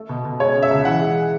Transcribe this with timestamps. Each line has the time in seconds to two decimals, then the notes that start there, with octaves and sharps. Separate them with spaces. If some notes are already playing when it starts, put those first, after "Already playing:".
Already playing: A3
0.09 B2
0.25 B2
0.39 G#3 C#5
0.55 C#3
0.62 E5
0.71 C#2
0.85 E3 F#5
1.00 G#3